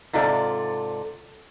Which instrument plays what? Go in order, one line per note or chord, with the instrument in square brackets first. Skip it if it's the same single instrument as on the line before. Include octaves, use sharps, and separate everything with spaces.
[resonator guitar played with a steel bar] G#2 C3 F4 A4 D5